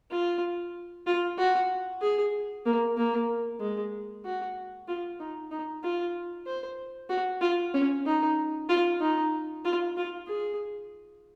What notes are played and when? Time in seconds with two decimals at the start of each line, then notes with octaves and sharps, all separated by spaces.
0.11 F4
1.07 F4
1.38 F#4
2.01 G#4
2.66 A#3
2.97 A#3
3.60 G#3
4.25 F#4
4.88 F4
5.19 D#4
5.51 D#4
5.84 F4
6.46 C5
7.09 F#4
7.41 F4
7.74 C#4
8.06 D#4
8.69 F4
9.00 D#4
9.65 F4
9.97 F4
10.27 G#4